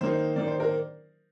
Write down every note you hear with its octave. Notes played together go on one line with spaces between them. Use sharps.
D#3 A#3 D#4 C5
D#3 A#3 D#4 D5
C5
A#4